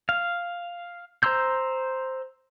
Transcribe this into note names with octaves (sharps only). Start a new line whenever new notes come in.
F5
C5 A#5 C6 E6 G6